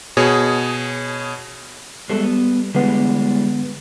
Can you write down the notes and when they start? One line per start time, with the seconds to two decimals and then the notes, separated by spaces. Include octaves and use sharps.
0.17 B2 G#4 C#5
2.09 G3 G#3 B3 A4
2.24 B3
2.74 D3 E3 G3 G#3 B3